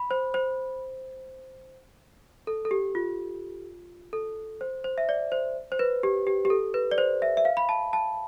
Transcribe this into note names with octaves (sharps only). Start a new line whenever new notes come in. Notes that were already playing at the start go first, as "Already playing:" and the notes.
Already playing: B5
C5
C5
A4
A4
G4
F4
A4
C5
C5
E5
D5
C5
C5
B4
G4
G4
G4
A4
B4
D5
C5
E5
E5
F5
B5
A5
A5